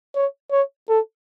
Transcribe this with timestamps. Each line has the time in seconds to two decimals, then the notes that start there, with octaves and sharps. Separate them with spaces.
0.15 C#5
0.51 C#5
0.89 A4